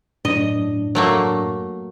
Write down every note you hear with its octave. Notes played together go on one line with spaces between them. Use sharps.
F#2 A2 D4 D#5
F#3 A3 A#3